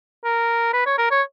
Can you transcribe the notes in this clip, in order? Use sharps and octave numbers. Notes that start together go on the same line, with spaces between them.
A#4
B4
C#5
A#4
C#5